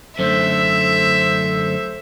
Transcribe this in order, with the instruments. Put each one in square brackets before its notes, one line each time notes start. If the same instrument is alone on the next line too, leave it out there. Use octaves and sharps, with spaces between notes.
[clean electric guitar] F#2 D3 A3 [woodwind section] A4 C5 [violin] E5